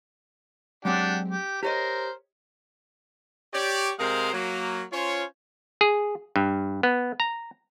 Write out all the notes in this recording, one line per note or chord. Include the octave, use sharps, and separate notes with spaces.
F#3 G#3 C4 D4 G4 F#5
G4
G4 A#4 C5 C#5 D#5
G4 C#5 D5
C3 G#3 G#4 A#4 C5 F5
F#3 A#3
C#4 F4 C5 C#5
G#4
G2
B3
A#5